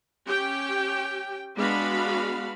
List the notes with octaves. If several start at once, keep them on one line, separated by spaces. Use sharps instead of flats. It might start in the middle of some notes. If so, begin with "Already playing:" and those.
C#4 G4 G5
G#3 B3 D4 F#4 F5 B5